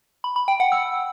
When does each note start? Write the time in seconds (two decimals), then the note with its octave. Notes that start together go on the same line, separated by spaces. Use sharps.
0.24 B5
0.36 B5
0.48 G5
0.60 F#5
0.72 E6